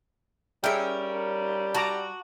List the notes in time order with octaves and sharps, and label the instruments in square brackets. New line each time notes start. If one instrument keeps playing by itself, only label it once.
[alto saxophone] G3 [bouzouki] C#4 A#4 [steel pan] G#4 E5 G5
[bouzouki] F#4 [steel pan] A5 A#5 D6